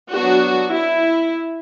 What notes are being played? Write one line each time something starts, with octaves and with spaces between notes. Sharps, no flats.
F#3 B3 D4 F#4
E4